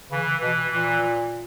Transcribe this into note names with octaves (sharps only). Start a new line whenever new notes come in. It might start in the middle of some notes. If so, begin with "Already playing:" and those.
C#3 E3
B2 E3
A#2 E3